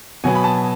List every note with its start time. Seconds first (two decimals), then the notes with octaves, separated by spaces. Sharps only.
0.24 B2 F#3 B3 G#5
0.35 B5
0.44 A5